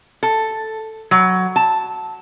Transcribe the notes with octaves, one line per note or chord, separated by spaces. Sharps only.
A4
F#3
A5